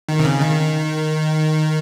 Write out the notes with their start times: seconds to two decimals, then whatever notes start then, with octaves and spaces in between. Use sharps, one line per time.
0.09 D#3
0.19 C3
0.25 C#3
0.41 D#3